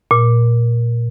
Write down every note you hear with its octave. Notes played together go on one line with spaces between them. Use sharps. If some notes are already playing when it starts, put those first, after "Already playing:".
A#2